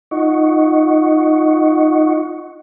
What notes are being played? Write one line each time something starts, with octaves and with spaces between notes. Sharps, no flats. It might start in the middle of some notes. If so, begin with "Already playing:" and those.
D#4 F4 D#5 F#5 C#6